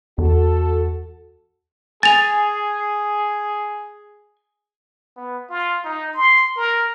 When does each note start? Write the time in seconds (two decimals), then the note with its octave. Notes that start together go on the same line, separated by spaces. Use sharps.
0.18 E2 F#4 A4
2.03 G#4 G#5 A6 F7
5.17 B3
5.50 F4
5.85 D#4
6.14 C6
6.57 A#4